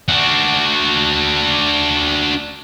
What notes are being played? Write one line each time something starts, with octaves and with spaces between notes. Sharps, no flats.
D4 F#4